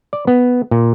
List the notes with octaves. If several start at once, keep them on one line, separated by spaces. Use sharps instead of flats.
D5
B3
A#2